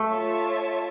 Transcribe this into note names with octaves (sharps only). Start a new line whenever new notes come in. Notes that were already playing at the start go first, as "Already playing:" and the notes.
Already playing: A3
F4 C#5 E5 A5